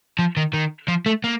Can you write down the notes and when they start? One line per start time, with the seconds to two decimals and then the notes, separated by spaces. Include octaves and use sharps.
0.19 F3
0.37 D#3
0.54 D#3
0.88 F3
1.06 A3
1.24 A#3